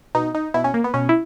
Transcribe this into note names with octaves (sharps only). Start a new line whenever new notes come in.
B2 D#4
D#4
B2 E4
C#4
A#3
B3
B2 C#4
E4